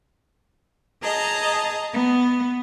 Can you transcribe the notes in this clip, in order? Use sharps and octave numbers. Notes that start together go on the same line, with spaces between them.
G#4 D#5 A5 A#5
B3